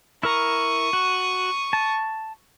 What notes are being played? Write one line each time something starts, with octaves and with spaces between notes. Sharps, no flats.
E4 A#4 A#5 C#6 D#6
F#4
A5